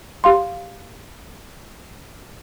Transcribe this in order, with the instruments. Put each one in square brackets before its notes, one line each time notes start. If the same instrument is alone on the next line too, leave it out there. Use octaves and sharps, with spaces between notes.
[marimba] G4 F5 C6